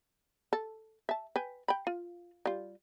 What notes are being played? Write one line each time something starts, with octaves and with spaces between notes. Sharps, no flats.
A4
E5 A5
B4 G5 G#5
G5 B5
F4
G3 F4